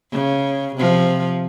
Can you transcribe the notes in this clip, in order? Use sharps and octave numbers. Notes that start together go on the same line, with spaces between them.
C#3
C3 F3